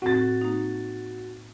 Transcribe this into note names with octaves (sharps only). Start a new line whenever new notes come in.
A2 C4 F#4 A6
A#3 D#4